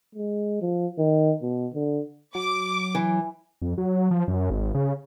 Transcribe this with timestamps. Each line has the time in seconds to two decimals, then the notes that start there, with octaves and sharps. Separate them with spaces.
0.15 G#3
0.62 F3
0.98 D#3
1.42 B2
1.74 D3
2.35 F#3 D6
2.95 E3
3.62 F2
3.78 F#3
4.11 F3
4.28 F#2
4.50 G#1
4.75 C#3